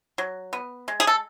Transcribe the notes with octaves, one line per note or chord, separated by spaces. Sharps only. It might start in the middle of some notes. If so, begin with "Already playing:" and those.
F#3
B3
G#3
G#4
A4